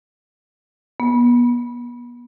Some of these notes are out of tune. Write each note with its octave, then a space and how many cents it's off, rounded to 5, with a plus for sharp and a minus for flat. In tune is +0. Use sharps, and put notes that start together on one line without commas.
B3 -35